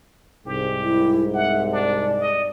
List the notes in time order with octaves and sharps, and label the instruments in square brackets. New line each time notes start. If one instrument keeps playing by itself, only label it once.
[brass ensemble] C2 G#2 [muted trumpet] G4
[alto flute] E4
[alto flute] E5 [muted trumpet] F#5
[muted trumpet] D4 [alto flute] D5
[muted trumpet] D#5